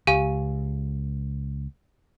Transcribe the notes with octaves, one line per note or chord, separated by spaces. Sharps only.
C#2 G4 F5 G#5